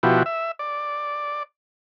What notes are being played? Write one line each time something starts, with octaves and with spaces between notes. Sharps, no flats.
B2 F3 E4 F#4 G4
E5
D5